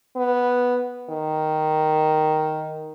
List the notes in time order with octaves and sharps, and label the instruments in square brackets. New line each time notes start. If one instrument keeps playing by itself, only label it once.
[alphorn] B3
D#3